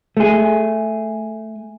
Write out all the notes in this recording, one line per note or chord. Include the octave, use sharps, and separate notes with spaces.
A3 G#4